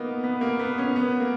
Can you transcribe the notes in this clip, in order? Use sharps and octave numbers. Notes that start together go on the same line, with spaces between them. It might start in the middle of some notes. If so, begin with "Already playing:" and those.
Already playing: A#3 B3 D#4
B3
A#3
B3
C#4
B3
A#3